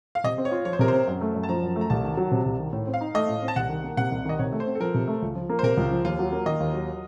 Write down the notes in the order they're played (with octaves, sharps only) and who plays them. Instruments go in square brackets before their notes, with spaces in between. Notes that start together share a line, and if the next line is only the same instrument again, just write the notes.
[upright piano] F5
[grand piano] C3 [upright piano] D#5
[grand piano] C4
[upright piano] C#5
[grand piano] F4
[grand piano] F3 [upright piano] C#5
[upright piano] C5
[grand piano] C3 [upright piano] A#4
[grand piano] C4 [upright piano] C5
[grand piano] F#2
A3
F#2
[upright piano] A5
[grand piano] F3 [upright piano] A#5
[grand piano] F#2
A3
[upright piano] A#5
[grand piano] C2 [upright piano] A5
[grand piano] D#3
F#3
C3
C2
D#3
A2
C4
[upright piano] F5
[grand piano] D#4
[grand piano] A3 [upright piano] D#5
[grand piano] A2
C4
[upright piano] A5
[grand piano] C2 [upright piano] F#5
[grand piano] D#3
A#3
[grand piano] C3 [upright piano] F#5
[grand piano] C2
[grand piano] D#3 [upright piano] D#5
[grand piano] C3 [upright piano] C#5
[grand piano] A3
[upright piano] C5
[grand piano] C4
[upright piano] A4
[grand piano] F3 [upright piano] A#4
[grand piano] C3
A3
C#2
F3
A#3
[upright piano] C5
[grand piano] C3 [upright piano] A#4
[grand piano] C#2
F3
[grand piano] D#2 [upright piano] F4
[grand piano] F#3
A#3
[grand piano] D#3 [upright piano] D#5
[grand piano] D#2
F#3